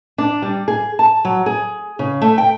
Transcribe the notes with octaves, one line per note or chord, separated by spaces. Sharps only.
D4
G3
G#4
A5
F#3
G#4
C#3
A3
G5